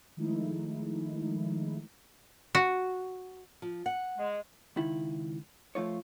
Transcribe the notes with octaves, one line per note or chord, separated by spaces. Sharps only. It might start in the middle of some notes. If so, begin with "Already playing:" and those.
D#3 F3 G#3 A3 D#4 E4
F#4
F3
F#5
G#3
C#2 D#3 E4
F3 A3 F4 C#5